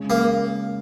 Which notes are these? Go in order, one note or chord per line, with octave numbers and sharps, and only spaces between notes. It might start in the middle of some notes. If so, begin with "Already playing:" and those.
Already playing: C#3 G#3 C#4
A#3